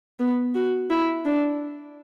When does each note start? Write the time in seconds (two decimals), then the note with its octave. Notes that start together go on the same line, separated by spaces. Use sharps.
0.20 B3
0.55 F#4
0.90 E4
1.25 D4